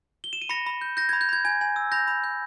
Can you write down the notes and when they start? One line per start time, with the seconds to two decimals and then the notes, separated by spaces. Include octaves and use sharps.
0.24 G7
0.33 E7
0.42 D#7
0.49 B5 A#6 C#7
0.66 B5
0.81 G6
0.97 G6 A#6
1.09 B5 G#6
1.21 G6
1.29 B5 G#6
1.45 G#5 G#6
1.61 G#5
1.76 E6
1.92 B5 G6 A#6
2.08 B5
2.24 G6